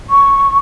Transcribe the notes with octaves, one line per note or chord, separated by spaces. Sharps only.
C#6